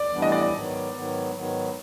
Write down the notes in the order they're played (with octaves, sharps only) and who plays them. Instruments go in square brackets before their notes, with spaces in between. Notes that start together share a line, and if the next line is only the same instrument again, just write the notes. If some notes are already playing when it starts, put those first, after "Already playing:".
Already playing: [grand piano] D5
[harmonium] A2 E3 G3 B3 D4
[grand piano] D#5
D5
D5
[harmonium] G#2 D#3 F#3 B3
G#2 D#3 F#3 B3
G#2 D#3 F#3 B3